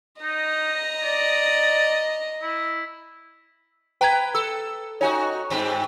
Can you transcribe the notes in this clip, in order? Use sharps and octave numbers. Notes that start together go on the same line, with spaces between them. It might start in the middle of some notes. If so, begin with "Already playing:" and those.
D#4 D#5 A#5
D5
E4
B4 G5 A#5 G#6
A4 E6
D#4 F#4 C#5 G#5
G2 C4